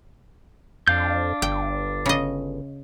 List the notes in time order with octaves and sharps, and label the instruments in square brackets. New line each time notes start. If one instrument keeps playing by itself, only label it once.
[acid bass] F2 [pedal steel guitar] D4 F5 G6
[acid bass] G1 [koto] G5
[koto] C#3 D#5